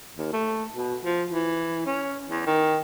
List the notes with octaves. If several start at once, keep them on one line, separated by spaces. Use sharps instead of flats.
D#2
A3
B2
F3
E3
C#4
E2
D#3